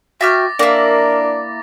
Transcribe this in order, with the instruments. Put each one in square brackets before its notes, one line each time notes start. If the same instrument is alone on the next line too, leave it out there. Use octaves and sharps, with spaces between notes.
[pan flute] F#4 [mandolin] E5 G5 F6 [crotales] D6 A6 A#6
[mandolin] A#3 E4 [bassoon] D4 [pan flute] A#4